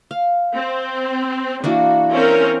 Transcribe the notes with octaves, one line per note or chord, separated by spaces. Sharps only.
F5
C4
E3 A#3 D4 F#4
C4 C#4 A#4